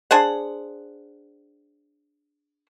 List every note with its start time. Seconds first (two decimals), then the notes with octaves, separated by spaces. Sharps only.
0.11 D4 G#4 C5 F#5